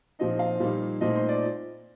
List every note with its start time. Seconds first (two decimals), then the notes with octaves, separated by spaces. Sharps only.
0.19 A#2 F3 C4 D#4 D#5
0.39 F5
0.60 A#2 G3 A#3 D#4
1.01 A#2 A3 C4 D#4 D#5
1.15 C5
1.29 D5